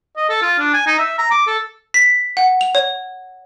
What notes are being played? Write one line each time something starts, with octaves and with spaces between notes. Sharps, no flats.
D#5
A4
F4
D4
G#5
D#4
E5
A#5
D6
A4
B6
F#5
F7
C#5